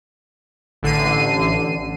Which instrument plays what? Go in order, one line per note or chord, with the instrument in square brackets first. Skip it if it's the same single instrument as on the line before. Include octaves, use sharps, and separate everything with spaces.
[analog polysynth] A1 D3 C7 D#7